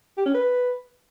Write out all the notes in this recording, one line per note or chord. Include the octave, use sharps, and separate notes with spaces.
G4
C#4
B4